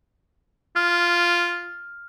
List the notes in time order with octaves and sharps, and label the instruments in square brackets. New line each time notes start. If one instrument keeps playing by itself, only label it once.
[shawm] F4 [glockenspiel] F6